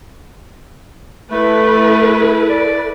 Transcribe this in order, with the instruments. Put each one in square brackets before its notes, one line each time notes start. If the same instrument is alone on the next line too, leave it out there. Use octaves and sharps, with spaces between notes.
[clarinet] A3 [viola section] E4 A4 B4
[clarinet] D5